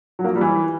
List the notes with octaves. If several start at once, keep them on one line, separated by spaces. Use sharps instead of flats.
F#3
A#3
F3
G3
E3